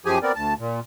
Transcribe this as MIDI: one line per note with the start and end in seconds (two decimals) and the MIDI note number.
0.06 0.18 42
0.06 0.18 53
0.06 0.18 67
0.06 0.18 68
0.06 0.18 80
0.23 0.32 59
0.23 0.32 60
0.23 0.32 70
0.23 0.32 74
0.35 0.54 38
0.35 0.54 81
0.59 0.80 46